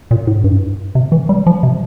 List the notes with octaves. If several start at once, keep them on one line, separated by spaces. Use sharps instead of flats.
A#2
A2
G2
C3
E3
G3
F3
C3